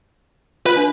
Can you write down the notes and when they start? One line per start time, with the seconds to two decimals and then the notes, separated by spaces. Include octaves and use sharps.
0.66 F4 B4
0.76 D4